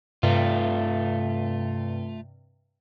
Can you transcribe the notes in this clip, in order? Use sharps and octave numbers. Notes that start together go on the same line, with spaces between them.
G2 C3 A3 F4